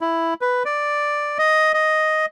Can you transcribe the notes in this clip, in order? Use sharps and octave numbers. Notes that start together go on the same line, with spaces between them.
E4
B4
D5
D#5
D#5